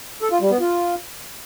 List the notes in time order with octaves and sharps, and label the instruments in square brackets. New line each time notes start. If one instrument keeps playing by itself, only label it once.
[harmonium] A4
F4
G3
B3
F4